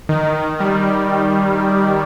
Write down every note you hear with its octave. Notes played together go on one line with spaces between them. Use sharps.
D#3
D#3
G3